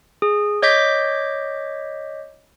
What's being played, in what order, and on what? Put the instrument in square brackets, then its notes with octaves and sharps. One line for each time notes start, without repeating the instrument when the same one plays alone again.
[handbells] G#4
C#5 D#5 D6 G6 B6